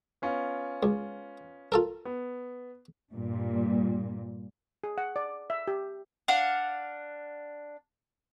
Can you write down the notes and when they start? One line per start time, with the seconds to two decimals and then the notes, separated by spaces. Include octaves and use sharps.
0.22 B3 C#4 F4
0.83 C#2
1.72 F4 A4 A#4
2.05 B3
3.12 G2 A#2 G3
4.84 G#4
4.98 F#5
5.16 D5
5.50 E5
5.68 G4
6.28 D4 F5 F#5